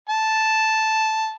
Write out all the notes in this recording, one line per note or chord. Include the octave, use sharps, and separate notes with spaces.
A5